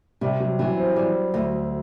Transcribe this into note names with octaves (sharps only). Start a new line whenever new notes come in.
C3 G3
F#3
E3 F#3
C4
G3
D2